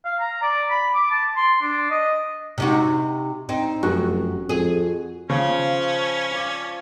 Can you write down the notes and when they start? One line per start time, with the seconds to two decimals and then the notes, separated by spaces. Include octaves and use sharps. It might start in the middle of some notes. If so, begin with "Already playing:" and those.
0.05 F5
0.20 A#5
0.43 D5
0.70 B5
0.94 D6
1.11 A5
1.37 C6
1.61 D4
1.90 D#5
2.58 C3 D#4 F#4
3.49 C4 D#4
3.83 F1 F#2 F#4
4.49 F2 G#4
5.30 C#3 F3 C#4 C6
6.31 D5 F5